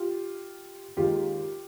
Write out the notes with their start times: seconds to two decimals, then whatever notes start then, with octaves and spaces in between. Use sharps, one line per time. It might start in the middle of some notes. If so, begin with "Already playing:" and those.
Already playing: F4 G4
0.97 D#2 D#3 G#3 F4 G4